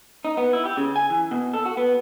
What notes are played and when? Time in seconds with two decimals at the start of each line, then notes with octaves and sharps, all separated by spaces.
0.25 D#4
0.37 B3
0.53 E4
0.65 G4
0.77 C#3
0.96 G#5
1.10 E3
1.31 B2
1.54 A4
1.66 F#4
1.77 B3